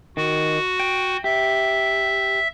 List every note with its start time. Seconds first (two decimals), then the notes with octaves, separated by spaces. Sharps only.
0.17 D#3 F#4
0.80 G5
1.24 G4 E5